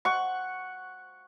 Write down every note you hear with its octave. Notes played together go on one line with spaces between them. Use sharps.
F#5 C#6